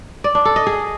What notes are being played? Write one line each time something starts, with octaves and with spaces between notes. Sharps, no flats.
D5
D4
A4
D#5
G#4